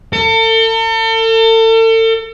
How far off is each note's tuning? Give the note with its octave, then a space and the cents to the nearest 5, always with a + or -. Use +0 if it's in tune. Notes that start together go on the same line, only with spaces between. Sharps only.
A4 +40